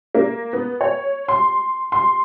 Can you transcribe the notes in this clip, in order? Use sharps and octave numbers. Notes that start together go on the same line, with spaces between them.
A#3
B3
C#5
C6
C6